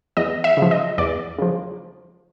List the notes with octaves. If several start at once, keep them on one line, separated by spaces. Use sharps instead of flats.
E2 D#5
E5
C#3 F3
D#5
E2 D5
C#3 F3